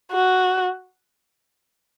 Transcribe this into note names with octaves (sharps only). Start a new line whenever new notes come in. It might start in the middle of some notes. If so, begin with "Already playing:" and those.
F#4